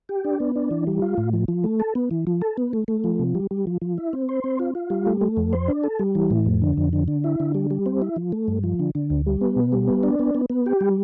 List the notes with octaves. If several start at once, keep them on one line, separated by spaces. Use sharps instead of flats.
G4
D4
B3
D4
E3
G3
F4
A2
F3
F3
A3
A4
B3
E3
F3
A4
B3
A3
A3
F3
C3
G3
G3
F3
F3
E4
C4
C5
C4
F4
F4
G3
A3
A3
F2
C5
D4
A4
G3
E3
A2
F2
D3
F2
D3
D3
E4
D3
G3
G3
C4
E4
F3
A3
G2
F3
D3
D3
D2
G3
B3
B2
G3
B3
D4
B3
B3
B3
G4
G3